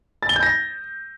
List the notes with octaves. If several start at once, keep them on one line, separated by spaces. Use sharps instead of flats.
A6
G7
G6
A#6